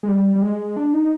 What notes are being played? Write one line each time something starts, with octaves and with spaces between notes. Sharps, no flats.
G#3
G3
G3
G#3
D4
D#4